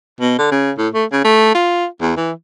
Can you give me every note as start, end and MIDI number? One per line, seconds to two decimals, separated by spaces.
0.20 0.36 47
0.38 0.49 50
0.51 0.72 49
0.78 0.88 45
0.94 1.05 57
1.12 1.20 49
1.24 1.53 57
1.55 1.86 65
2.01 2.13 40
2.17 2.32 52